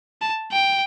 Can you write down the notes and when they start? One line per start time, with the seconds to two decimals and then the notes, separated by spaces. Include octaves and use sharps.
0.22 A5
0.52 G5